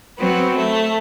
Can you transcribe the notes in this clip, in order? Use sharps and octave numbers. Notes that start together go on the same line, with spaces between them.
F#3 B3 C4
A3